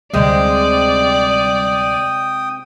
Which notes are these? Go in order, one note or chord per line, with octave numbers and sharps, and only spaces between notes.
D2 C3 G3 G#3 D5 G5 D#6